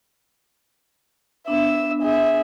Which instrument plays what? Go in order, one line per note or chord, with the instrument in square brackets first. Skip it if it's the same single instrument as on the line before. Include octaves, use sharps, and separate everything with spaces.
[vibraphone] B3 D4 [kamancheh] E5 E6
[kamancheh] G#4 E5